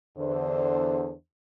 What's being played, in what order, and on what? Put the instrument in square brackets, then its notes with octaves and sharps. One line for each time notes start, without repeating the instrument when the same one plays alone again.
[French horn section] E2 D3 C5